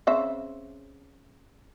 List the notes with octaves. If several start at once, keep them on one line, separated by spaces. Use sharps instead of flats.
C#3 C4 E5